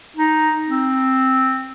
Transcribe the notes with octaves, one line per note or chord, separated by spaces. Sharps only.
D#4
C4